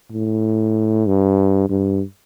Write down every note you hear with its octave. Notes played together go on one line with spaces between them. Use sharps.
A2
G2
G2